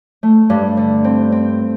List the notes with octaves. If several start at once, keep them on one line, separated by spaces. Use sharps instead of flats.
A3
G2
D3
C4
C4